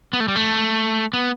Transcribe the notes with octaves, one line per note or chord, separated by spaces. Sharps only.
B3
A3
G3
A3
B3